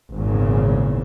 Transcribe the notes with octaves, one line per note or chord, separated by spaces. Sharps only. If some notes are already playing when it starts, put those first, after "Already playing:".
G#1 E2 A#2 C#3